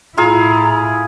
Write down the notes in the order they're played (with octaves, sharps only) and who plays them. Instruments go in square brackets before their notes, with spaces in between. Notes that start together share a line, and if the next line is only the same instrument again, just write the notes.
[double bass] A2 E4 [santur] F4 G#4 [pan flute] A#5